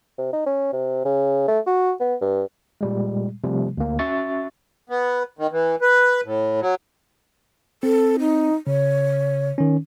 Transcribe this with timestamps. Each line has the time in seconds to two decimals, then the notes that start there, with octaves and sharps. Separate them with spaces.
0.18 C3
0.33 D#4
0.46 C#4
0.73 C3
1.05 C#3
1.48 A3
1.67 F#4
2.00 B3
2.21 G2
2.81 A#2 G3 G#3
3.44 C3 F3 G3 A3
3.78 D2 A#3
3.99 C#4 F#4 E5 C#6 A6
4.90 B3
5.38 D#3
5.52 E3
5.82 B4
6.24 A2
6.61 F#3
7.83 C4 A4
8.19 D#4
8.67 C#3 C#5
9.58 D#3 C#4